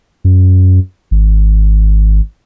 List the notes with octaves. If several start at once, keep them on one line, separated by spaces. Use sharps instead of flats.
F#2
G#1